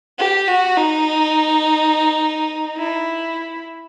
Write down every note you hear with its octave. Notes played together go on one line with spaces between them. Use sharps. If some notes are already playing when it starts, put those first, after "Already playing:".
G4
F#4
D#4
E4